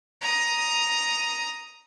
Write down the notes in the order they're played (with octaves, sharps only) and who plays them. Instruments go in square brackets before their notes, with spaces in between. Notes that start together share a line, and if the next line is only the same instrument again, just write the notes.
[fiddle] A#5 D#6